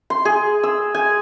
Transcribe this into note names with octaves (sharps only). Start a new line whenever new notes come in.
C6
G#4
E6
G#5